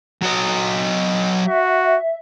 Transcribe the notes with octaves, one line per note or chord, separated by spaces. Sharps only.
F#3 D#5
F#4 E5